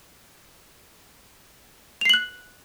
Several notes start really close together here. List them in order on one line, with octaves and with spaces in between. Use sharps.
F7 C7 F#7 F#6